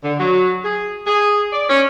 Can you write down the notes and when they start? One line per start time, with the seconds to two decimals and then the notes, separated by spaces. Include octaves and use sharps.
0.03 D3
0.20 F#3
0.64 G#4
1.07 G#4
1.52 D5
1.69 C#4